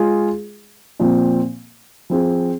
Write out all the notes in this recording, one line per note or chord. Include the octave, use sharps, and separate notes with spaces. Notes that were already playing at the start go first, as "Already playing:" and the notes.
Already playing: G#3 F4 G#4
A#2 F3 C4
F3 C4 G#4